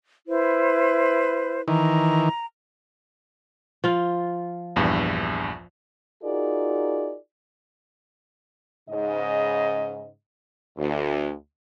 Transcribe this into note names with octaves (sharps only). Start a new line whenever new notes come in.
E4 B4 C5
D#3 E3 A#5
F3 F4
A#1 E2 G2
D#4 F4 F#4 G#4 A#4 D5
G#2 C#3 D#5
D2